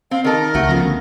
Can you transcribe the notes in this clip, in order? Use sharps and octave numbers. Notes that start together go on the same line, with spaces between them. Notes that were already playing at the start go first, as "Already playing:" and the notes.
C4 F5
D#3 A4 A#4 A#5
C#2 A3 F#4
C#3 F3 B3
D2